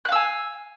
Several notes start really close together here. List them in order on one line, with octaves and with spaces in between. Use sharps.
F#6 F5 E6 G#5